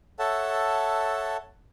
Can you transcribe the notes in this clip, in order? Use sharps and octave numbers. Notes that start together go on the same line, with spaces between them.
A4 C#5 E5 F#5 A5